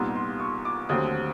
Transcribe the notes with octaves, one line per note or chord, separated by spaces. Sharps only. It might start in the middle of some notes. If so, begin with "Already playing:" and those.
Already playing: C2 A#2 G3 B3 D#4 C6
C6
C#6
D6
D#2 D3 F#3 A3 C4 D#6